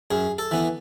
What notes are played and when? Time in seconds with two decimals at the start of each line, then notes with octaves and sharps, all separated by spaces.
0.11 F#2 G#4
0.38 A4
0.51 E3 B3